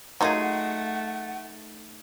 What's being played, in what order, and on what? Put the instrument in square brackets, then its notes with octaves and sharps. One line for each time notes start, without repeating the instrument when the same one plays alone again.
[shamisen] F#3 A#3 F4 [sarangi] A3 [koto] D#4 G#4 [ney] F#5